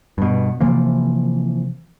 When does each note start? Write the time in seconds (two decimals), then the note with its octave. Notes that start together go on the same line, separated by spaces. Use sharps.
0.18 G2 B2
0.61 C3 E3 F3 A#3